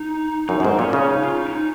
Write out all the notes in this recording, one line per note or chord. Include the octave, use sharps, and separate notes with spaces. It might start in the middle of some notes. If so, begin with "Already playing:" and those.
Already playing: D#4
F#2 D#4
F#2
G#2 C4
A#2 C#4
C#3 C#4
D#4
F4
D#4
C#4
D#4